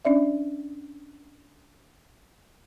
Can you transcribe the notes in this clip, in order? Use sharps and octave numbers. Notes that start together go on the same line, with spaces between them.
C#4 D4 D5 E5